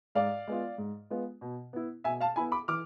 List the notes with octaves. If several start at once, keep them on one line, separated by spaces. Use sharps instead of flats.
G#2 D5 F5
G#3 B3 F4
G#2
G#3 B3 F4
B2
B3 E4
B2 E5 G#5
F5 A5
B3 E4 G#5 B5
B5 D6
E3 D6 F6